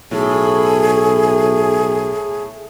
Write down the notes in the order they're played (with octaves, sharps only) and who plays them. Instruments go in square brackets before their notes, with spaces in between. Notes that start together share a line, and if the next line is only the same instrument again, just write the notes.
[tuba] B1 [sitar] A2 [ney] G#4